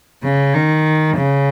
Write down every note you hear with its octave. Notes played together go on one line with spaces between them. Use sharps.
C#3
D#3
C#3